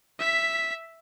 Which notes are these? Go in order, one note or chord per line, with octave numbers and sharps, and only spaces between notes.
E5 B6